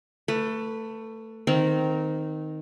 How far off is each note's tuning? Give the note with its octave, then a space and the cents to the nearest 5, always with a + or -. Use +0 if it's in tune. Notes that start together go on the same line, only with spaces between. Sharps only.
A3 +20 B4 +0
D#3 +0 C4 -20 A#5 +0